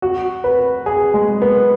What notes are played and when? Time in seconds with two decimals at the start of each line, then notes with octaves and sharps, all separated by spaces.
0.02 F#4
0.44 B4
0.86 G#4
1.14 G#3
1.42 B3